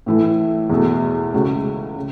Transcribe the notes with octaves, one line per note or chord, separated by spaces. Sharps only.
A2 E3 A3 E4
E2 B2 A3
C#2 C#3 A3 F#4
C#3